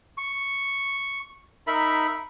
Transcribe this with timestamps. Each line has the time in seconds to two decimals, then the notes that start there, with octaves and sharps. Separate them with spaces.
0.17 C#6
1.67 D#4 A#4 E5 B5